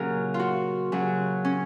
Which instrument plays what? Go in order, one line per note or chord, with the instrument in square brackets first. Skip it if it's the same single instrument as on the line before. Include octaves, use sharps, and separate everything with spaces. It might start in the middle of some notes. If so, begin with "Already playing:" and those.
Already playing: [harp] A#2 C#3 F#3 A#4
F4
F#4
C#3 F#3
C#4